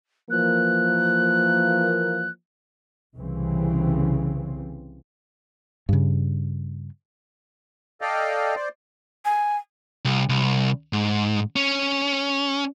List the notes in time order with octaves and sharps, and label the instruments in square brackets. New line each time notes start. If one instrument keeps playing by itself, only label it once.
[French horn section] E3 F3 A#3 [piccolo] F#6
[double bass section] C2 C#3 E3 C4
[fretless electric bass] G2 C#3
[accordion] A4 D5 D#5 F5 G5
C5 D5
[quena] G#5
[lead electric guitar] C2
C2
G#2
C#4